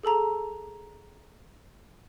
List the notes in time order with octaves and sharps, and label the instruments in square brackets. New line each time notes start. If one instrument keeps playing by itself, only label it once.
[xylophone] G#4 A4 A5 A#5